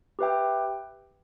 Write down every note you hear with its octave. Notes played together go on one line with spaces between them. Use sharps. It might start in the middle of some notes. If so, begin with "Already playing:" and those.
G4 B4 E5 G5